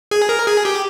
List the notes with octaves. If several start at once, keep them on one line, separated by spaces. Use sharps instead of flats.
G#4
A#4
G#4
G4